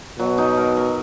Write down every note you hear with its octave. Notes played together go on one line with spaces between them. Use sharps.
B2 F#3
D#4
A#4
A#4